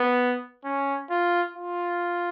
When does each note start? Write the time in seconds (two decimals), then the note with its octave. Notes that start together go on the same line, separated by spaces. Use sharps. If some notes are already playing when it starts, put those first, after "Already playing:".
Already playing: B3
0.65 C#4
1.10 F4
1.57 F4